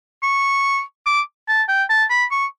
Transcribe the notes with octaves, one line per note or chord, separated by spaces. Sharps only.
C#6
D6
A5
G5
A5
B5
C#6